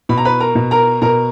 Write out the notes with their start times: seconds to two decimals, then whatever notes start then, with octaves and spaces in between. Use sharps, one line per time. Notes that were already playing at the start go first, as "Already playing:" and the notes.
0.09 B2 B5
0.18 A#5
0.25 B4 B5
0.40 A#4 A#5
0.55 B2
0.71 A#4 A#5
1.02 B2 A#4 A#5